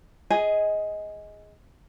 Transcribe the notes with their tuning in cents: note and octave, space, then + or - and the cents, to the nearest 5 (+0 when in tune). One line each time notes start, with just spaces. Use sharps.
G#4 +0 D#5 +15 G#5 +0